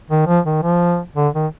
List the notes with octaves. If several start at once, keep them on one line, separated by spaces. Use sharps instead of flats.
D#3
F3
D#3
F3
D3
D#3